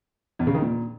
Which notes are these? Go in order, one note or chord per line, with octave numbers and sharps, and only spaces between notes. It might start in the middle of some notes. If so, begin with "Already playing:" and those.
E2
C#3
D#3
A#2